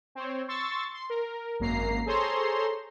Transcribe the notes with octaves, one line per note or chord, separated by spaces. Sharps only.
C4 C5 C#5
C6 C#6 E6 A6
C6
A#4
G#1 F#2 A#3 A#5 C7
G#4 A4 C5 C#5 A#5 C6